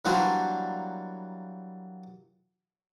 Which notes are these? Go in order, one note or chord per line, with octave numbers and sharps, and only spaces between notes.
E3 F#3 G3 A#3 D4 C5